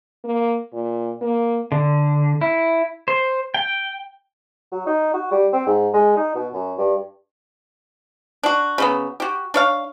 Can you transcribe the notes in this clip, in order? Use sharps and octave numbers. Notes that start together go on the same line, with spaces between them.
A#3
A#2
A#3
D3
E4
C5
G5
F#3
D#4
F#4
G3
C4
G#2
G#3
D#4
B2
F#2
G2
D4 F#4
C#3 F#3 B3
F#4 G4
D4 C#5 F5